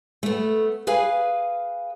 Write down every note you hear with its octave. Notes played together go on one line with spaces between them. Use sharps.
A3 B3
G#4 B4 F5 G#5